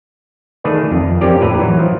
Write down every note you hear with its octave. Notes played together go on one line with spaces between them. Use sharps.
D#3 A3 G#4 B4 D5
F2
C4 C#4 F4 G4 A#4 D5
A2 B4 E5 A#5
E3 F#3
F3